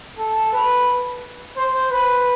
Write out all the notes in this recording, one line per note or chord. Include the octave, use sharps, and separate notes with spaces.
A4
B4
C5
B4